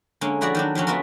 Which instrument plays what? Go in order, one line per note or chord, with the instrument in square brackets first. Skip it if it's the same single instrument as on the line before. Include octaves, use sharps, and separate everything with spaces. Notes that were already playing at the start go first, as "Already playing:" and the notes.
[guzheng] D3 G#3 A#3 C#4
F2 E4 F#4 G#4 D5 A#5
D#3 F#3 D4
F2 D3 F#3 C#4
A3 B3 F4 F#4 A#4